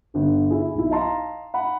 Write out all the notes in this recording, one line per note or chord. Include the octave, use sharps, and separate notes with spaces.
G1 D3
E4 G#4
B1 E4
D#5 F5 A5 A#5 C6
F#5 B5